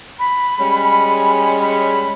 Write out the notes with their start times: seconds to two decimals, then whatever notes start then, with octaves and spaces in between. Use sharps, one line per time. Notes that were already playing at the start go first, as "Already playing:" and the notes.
0.19 B5
0.60 G3 G#3 C#4
1.61 B5